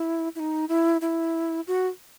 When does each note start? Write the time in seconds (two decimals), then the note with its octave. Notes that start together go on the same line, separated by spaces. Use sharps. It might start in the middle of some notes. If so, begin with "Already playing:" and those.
Already playing: E4
0.35 E4
0.40 D#4
0.69 E4
1.01 E4
1.67 F#4